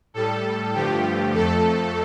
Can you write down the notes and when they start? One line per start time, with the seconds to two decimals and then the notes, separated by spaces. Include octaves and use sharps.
0.14 A2 G3 A4
0.73 G2 D3 F3 A3 G4
1.33 F2 F3 A3 A4